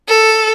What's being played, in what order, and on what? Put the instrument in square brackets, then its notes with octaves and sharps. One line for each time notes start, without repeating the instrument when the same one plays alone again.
[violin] A4